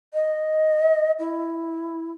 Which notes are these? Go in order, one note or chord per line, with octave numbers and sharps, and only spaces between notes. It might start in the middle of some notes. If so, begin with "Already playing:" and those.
D#5
E4